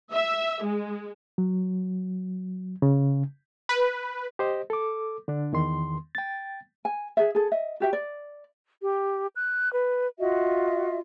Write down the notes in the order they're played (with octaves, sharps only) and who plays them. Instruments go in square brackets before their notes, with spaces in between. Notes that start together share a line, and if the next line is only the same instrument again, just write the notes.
[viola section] E5
G#3
[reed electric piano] F#3
C#3
[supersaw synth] B4
[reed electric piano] G4 C5 D#5
A4 D6
D3 D4
E2 D#3 C6
G5 A6
[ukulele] G#5
G#4 E5
G#4 A4
D#5 E5
F#4 G4 E5
D5
[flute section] G4
F#6
B4
F4 F#4 D#5 E5